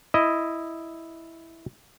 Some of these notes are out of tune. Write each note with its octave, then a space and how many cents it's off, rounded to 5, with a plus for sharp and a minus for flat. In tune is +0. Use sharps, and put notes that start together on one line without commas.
E4 +0 D#5 +0